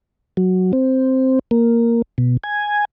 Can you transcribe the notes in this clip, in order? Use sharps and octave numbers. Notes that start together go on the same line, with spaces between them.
F#3
C4
A#3
B2
G#5